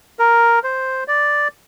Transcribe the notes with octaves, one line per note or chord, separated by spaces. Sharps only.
A#4
C5
D5